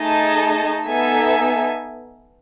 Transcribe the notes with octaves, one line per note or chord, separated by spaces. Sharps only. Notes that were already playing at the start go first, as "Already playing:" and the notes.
Already playing: A3 D#4 G#4 D#5 A5
B3 D#4 A4 E5 G#5